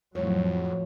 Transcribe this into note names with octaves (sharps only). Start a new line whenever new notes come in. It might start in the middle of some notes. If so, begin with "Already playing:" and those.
F2 A2 F3 F#3 C#5